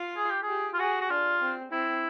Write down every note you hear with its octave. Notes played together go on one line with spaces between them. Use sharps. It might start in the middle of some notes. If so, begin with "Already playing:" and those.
Already playing: F4
G#4
G4
G#4
G4
F4
F#4 G#4
F#4
D4 F4
C4
C4 E4